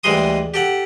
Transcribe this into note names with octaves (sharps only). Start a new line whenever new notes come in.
D2 E3 G3 G#3 C6 D#6
G4 A4 F#5